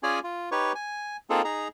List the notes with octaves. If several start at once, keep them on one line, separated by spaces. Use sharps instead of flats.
C#4 F4 G#4 C#5 D5 G#5
F4
D#4 G4 B4 C#5 C#6
G#5
A#3 C4 D#4 F4 G#4 A4
D#4 G#4 A#5